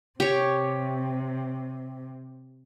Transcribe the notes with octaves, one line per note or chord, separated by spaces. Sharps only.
C3 G4 C#5